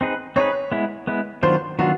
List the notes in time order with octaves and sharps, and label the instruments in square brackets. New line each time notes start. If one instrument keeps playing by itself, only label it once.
[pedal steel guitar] C4 D#4 G#4 B4
[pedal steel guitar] C4 D#4 G#4 B4 [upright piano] C#5
[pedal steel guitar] G#3 B3 E4
G#3 B3 E4
[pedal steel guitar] D#3 F#3 B3 D4 F4 [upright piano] C5
[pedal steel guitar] D#3 F#3 B3 D4 F4 [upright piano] F#4